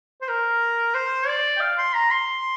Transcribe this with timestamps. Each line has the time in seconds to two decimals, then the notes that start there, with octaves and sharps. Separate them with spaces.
0.21 C5
0.29 A#4
0.95 C5
1.28 D5
1.57 G5
1.60 F5
1.78 C6
1.94 A#5
2.11 C6